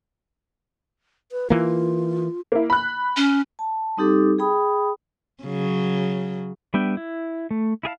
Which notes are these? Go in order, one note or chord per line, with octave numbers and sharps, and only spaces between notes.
B4
E3 A#3 F4
A#3 E4
B5 F#6
C#4
A5
G3 C4 D#4 G4 A4 D6
G#4 G5 B5 D#6
C#3 F#3
G3 B3 D4 E5 G5
E4
A3
E4 G#4 F5 A5